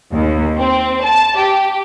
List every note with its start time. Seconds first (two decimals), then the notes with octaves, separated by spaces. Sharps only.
0.13 D#2
0.58 C4
1.03 A5
1.38 G4